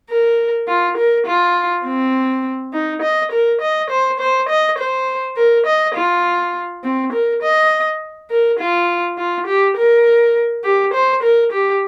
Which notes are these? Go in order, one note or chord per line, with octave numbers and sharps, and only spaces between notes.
A#4
F4
A#4
F4
C4
D#4
D#5
A#4
D#5
C5
C5
D#5
C5
A#4
D#5
F4
C4
A#4
D#5
A#4
F4
F4
G4
A#4
G4
C5
A#4
G4